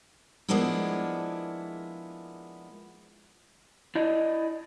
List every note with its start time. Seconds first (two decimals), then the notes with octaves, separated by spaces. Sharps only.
0.49 F3 G#3 A#3 B3 D4 E4
3.95 E4 D5 D#5